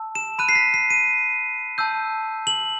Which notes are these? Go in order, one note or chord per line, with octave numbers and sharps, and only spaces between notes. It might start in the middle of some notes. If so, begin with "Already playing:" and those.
Already playing: A5 E6
E7
B5 F#6 D#7
C7
B6
C7
D#7
A5 E6 G6
F#7